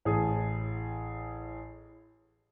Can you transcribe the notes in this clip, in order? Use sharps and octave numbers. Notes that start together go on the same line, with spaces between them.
A1 A2 G#4 A5 D#6